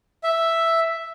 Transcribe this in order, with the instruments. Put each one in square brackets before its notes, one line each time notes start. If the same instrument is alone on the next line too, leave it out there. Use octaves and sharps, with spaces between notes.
[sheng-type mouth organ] E5